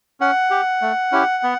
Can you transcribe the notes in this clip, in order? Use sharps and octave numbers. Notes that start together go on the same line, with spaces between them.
C#4 F#5
G4
A3
C#4 E4 G4
B3